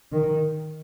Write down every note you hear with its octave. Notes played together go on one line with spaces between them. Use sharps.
D#3